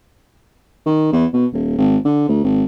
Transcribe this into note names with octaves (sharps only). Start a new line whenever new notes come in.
D#3
E2
B2
D#1
G#1
D3
D2
G#1